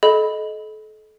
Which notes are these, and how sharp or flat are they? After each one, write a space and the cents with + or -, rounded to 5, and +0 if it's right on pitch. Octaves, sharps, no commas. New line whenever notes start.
A4 -35 D#5 +0 B5 +0